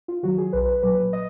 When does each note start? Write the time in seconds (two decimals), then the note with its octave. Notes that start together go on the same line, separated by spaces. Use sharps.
0.08 F4
0.23 D#3 F#3 F#4
0.38 G#4
0.53 B1 B4
0.68 B4
0.83 A#2 F#3 B4
1.13 D#5